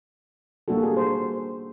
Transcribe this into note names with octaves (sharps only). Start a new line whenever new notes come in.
G3 A#3 D4 F#4 A4
G#4
C5